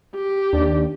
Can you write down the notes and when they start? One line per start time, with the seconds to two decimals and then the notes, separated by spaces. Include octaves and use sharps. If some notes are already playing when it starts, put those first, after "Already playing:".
0.15 G4
0.53 D#2 D4 D5